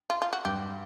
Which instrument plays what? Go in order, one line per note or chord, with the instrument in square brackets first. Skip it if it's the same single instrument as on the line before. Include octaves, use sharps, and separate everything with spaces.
[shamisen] F4
F4
F#4
[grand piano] G2 [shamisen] G4